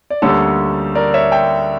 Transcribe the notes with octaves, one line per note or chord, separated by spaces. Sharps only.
D5
D2 D3 G3 A#3 C#4 A4 C#5
A#4 D5
C#5 E5
E5 G5